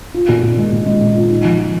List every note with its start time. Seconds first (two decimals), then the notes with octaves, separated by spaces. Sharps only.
0.14 F4
0.29 A#2
0.43 A#2
0.58 G#3
0.72 A#2
0.86 G#3
1.01 G#3
1.15 F4
1.30 D#4
1.44 F3
1.59 F3